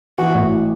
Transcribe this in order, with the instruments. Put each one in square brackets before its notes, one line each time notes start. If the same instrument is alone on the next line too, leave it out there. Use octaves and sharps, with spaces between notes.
[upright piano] E3 [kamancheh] F#4
[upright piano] A1